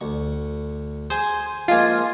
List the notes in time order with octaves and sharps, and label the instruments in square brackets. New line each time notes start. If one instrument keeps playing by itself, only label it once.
[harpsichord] D2 C#6
[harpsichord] G#4 [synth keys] C5 G#5
[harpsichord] F3 G#3 A#3 [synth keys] F4 G#5